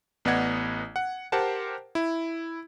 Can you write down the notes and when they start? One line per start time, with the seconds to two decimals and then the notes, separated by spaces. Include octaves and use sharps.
0.25 A1 B3 D5 D#5 F#5 G#6
0.96 F#5
1.32 G4 A#4 C5 F#5 A5
1.95 E4